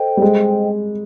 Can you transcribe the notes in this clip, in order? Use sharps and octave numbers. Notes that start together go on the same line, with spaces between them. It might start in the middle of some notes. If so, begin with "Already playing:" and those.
Already playing: A4 C5 D#5 G5
G3
G#3